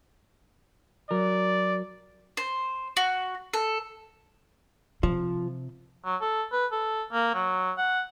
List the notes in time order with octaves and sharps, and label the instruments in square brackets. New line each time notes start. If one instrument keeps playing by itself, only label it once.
[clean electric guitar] F#3 A#4 [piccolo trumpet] D5
[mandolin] C5
F#4
A4
[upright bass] C3 [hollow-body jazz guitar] F3
[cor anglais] F#3
A4
B4
A4
A#3
F#3
F#5